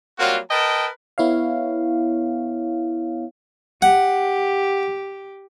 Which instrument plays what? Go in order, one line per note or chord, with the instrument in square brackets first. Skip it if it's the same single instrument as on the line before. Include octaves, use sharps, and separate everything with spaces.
[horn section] F#3 G3 A#3 C4 F4 F#4
A#4 B4 D#5 G5 A5
[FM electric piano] B3 E4 C#5 F5
[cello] G4 [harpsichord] F#5